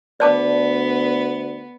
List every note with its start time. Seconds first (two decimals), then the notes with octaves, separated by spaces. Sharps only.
0.20 D2 B3 D5 A5 D6